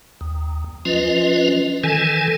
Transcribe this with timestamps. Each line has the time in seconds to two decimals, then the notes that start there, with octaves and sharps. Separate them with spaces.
0.21 D#2
0.85 F3 C#4 F4 B4 D#5
1.84 D#3 E3 A4 G#5